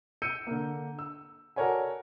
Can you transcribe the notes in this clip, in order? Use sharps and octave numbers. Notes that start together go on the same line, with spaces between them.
E6 G6 C#7 D#7
D3 A#3
E6
F#4 A4 A#4 C#5 D5 G#5